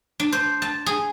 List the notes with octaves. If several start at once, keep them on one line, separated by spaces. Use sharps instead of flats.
D4
C5
A5
G#4